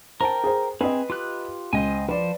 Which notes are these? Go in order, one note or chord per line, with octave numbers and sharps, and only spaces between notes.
A#4 C5 G5 A5
G#4 C5
C4 G#4 B4 D#5
F4 G4 F#6
C#2 C5 D#5 G#5
F3 B4 C5 D5